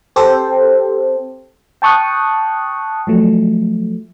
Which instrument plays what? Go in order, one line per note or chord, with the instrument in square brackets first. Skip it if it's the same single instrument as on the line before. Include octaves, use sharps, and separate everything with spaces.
[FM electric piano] C4 G4 A4 C5
G5 A5 C#6 D#6 F#6
F3 F#3 A3